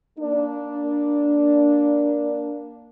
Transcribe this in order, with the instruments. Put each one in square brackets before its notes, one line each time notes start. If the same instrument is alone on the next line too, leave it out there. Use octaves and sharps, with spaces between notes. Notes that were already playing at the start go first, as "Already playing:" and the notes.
[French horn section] A#3 D4